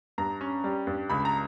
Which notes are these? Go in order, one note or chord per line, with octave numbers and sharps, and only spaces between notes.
G2 A#5
C#4
G3
G2
C#2 B5
A#5